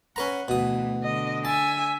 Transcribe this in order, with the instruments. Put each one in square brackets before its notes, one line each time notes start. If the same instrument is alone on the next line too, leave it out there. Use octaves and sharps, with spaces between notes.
[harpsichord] C#4 B4 A#5 [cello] F#5
[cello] D2 E3 [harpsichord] B2 D#6
[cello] D3 [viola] D#5
[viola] E5 G#5 [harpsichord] A5